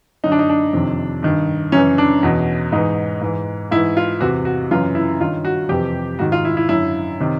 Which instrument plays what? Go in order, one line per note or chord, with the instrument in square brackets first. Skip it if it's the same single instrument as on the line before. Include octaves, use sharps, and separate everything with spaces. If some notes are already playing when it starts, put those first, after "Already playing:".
[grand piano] F#2 D3 D#4
D4
D#4
D4
F2 C3 D#3
G2 D#3
F#2 C#3 E3 C#4
D4
E2 B2
G#2 E3 D#4
G#2 E3
G#2 E4
E3
F4
E2 C3 E3 F#4
F#4
F#2 C#3 E3 F4
E4
G2 D#3 F4
F#4
F2 C3 E3 G4
G#2 D#3 F#4
F4
E4
E4
F#2 D3 E4
C3 D#3